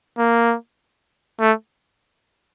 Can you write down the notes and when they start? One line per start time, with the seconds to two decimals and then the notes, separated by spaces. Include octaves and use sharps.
0.18 A#3
1.40 A3